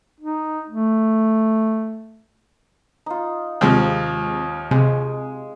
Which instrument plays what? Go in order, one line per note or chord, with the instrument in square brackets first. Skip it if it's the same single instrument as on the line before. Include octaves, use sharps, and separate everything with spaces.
[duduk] D#4
A3
[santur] D#4 F4
[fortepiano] D#2 F3 [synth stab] C3 G#3 C4 [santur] D#5
[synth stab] C3 [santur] G#3